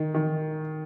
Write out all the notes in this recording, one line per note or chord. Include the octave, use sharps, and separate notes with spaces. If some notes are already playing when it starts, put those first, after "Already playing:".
Already playing: D#3
D#3